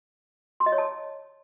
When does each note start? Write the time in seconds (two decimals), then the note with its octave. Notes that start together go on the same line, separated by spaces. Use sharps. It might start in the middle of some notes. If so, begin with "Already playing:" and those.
0.60 C6
0.66 D#5
0.72 C#5
0.78 A5